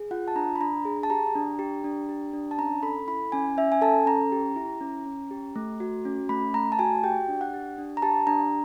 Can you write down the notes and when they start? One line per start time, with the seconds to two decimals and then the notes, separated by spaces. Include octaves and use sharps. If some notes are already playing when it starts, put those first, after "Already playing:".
Already playing: G#4
0.11 F4 F#5
0.28 A5
0.36 D4 A#5
0.56 B5
0.60 D4 A#5
0.85 G#4
1.03 A5
1.10 G4 A#5
1.35 D4
1.59 G4
1.84 D4
2.09 G4
2.33 D4
2.51 A5
2.58 C#4 A#5
2.83 A4 B5
3.08 E4 B5
3.32 C#4 G#5
3.57 C#4 E5
3.72 G#5
3.81 A4 A5
4.06 C#4 A#5
4.32 G4
4.56 E4
4.81 C#4
5.06 C#4
5.31 G4
5.56 A3
5.80 F#4
6.05 C#4
6.29 A3 B5
6.54 A3 A#5
6.72 A5
6.79 F#4 G#5
7.04 G4 G5
7.28 D4
7.41 F#5
7.54 G4
7.78 D4
7.97 A#5
8.02 G4 A5
8.27 D4 A#5